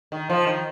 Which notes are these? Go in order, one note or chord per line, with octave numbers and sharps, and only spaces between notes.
D#3
F3
D#3